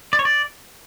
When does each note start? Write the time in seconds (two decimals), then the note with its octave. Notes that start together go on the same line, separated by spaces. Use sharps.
0.13 D5
0.19 C#5
0.25 D5